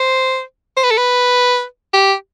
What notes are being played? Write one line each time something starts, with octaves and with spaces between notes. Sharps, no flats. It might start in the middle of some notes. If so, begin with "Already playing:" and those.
Already playing: C5
C5
B4
A4
B4
G4